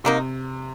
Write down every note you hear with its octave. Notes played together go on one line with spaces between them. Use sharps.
C3 F#3 A#3 D#4